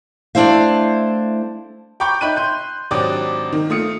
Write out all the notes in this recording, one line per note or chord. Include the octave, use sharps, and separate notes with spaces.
A3 D4 E4 C5 F5
G5 A#5 B5 C#6 D6 G6
D#4 E5 B5 F#6 G6 D#7
C6 G6
G#1 F#3 D4 G4 D6 D#6
D#3
A3 F4 D#6 C#7